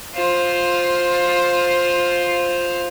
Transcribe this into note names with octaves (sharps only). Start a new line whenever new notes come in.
F4 C5